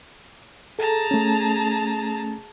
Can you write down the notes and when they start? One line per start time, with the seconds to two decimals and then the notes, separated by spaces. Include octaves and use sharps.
0.79 G#4 A4 A5 A#5
1.11 A3 C#4